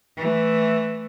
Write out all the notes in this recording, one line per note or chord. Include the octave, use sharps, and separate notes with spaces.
E3 A3